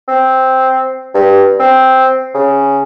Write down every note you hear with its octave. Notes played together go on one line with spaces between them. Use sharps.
C4
G2
C4
C#3